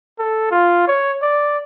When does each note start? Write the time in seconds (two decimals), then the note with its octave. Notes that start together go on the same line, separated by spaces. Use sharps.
0.19 A4
0.51 F4
0.88 C#5
1.22 D5